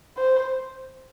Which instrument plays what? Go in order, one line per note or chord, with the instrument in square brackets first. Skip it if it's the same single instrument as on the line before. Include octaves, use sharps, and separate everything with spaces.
[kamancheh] C5